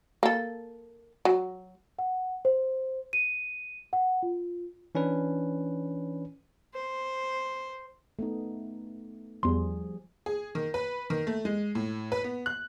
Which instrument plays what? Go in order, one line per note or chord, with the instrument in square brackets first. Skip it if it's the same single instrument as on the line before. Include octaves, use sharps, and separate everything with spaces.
[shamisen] A#3 A4
F#3
[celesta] F#5
C5
D#7
F#5
F4
[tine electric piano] E3 C#4 D4 B4
[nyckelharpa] C5
[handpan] A3 B3 D#4
[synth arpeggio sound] E2 C6 [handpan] F3 G3 G#4
[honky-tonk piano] G#4
D#3
B4
D#3
A3
G#3
A2
B4
B3
F#6